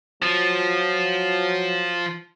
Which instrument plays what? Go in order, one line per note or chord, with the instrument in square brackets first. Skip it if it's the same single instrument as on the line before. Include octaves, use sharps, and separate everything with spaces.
[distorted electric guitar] F3 [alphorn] F#3